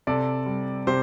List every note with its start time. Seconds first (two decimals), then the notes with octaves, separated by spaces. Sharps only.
0.07 C3 A4 D5
0.46 G3
0.87 C3 G4 C5